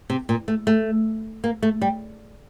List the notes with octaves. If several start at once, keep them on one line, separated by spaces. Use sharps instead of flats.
C3
A#2
A3
A3
A#3
A3
G3